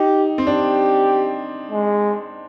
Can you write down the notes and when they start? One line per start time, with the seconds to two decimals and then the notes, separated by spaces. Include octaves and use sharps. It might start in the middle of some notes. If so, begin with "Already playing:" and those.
Already playing: D#4 G4
0.38 C4
0.46 D4 G4
1.71 G#3